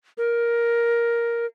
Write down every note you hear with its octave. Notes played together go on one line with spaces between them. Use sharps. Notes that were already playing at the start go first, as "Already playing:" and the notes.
A#4